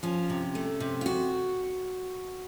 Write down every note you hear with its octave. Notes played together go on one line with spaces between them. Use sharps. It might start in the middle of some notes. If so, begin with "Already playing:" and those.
F3 C#4
C3
A3
C3
F4
C3 F#4